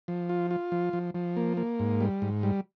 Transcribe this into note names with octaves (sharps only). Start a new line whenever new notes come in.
F3
F4
F4
F3
F3
F3
A#3
A#3
G#2
G3
G#2
G3